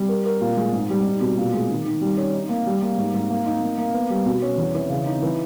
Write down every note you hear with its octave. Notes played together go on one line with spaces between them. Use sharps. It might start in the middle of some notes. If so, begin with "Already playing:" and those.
Already playing: G3
A#4
A#4
A#2
G#3
G#2
G3
D#4
B2
A#2
G#3
D#3
D#3
G3
C#4
D#4
A#3
G3
A#3
G#2
G#2
A#3
D#4
A#3
A#3
B3
G3
B2
C#4
E2
E3
C#3
D#4
E3